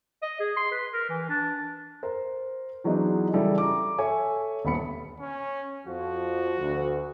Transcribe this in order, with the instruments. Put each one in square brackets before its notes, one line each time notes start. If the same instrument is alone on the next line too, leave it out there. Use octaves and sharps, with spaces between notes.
[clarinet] D#5
G#4
C6
B4
A#4
E3
D4
[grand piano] A#4 C5
E3 F#3 G#3 B3 D4 D#4
C#3 E3 G3 E4 A4
A#5 D6
A4 C#5 E5 G#5
D#1 B3 B5 C#7
[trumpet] C#4
[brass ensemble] F2 F3 [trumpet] F#4
[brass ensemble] D2